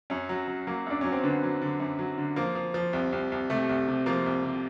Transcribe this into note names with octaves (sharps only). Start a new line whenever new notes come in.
F#2 C#4
F#3
F#3
F#3 A#3
F#2 D4
F#3 C#4
C4
D3 B3
F#3
D3
F#2
F#3
D3
F3 A#3
F3
F3
C2
C2
C2
C3 A3
C2
C3
F3 A#3
C2
C3